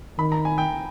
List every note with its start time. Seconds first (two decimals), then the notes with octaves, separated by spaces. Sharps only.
0.18 D#3 B5
0.32 A#5
0.45 G#5
0.58 G5